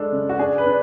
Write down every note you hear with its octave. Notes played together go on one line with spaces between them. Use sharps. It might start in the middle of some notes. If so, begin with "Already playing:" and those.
Already playing: G#3 D4 A4
C#3
F#4
D4 G#4
B4
D4